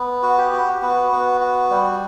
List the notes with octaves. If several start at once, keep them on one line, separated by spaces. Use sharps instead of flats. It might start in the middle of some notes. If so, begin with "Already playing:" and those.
Already playing: B3
F#4
G4
F#4
B3 F#4
B3
F#4
G3